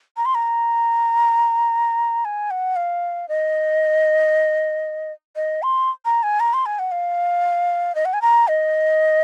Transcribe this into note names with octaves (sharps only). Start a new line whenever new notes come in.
A#5
C6
A#5
G#5
F#5
F5
D#5
D#5
C6
A#5
G#5
A#5
C6
G#5
F#5
F5
D#5
F#5
G#5
A#5
D#5